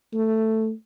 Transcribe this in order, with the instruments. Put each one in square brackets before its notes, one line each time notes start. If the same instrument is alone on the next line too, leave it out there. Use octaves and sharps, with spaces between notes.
[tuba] A3